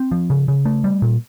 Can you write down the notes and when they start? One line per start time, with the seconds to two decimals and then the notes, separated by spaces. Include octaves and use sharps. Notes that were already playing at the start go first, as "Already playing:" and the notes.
Already playing: C4
0.12 F3
0.30 C#3
0.48 C#3
0.65 A3
0.84 G3
1.02 A#2